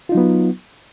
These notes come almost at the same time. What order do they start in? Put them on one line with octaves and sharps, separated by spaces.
F4 D#4 F#3 B3